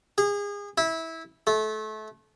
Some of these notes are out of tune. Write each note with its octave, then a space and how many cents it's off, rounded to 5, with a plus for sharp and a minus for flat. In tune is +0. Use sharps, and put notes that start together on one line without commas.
G#4 -30
E4 -20
A3 -25